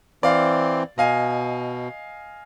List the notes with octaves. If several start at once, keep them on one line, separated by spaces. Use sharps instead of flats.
E3 C4 D5 F5
B2 D#5 F5 G#5